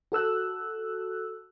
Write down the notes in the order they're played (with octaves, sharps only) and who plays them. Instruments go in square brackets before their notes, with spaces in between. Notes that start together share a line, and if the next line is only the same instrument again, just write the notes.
[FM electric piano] F#4 A4 E6 F#6